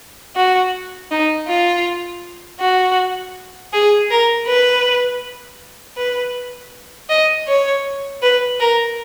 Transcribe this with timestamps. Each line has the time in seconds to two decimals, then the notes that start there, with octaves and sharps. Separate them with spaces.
0.36 F#4
1.11 D#4
1.48 F4
2.61 F#4
3.73 G#4
4.11 A#4
4.47 B4
5.97 B4
7.10 D#5
7.48 C#5
8.22 B4
8.60 A#4